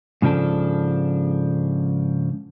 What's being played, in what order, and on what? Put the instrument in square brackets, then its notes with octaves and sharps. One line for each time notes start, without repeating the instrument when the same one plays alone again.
[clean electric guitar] G#2 C#3 F3 D4 A4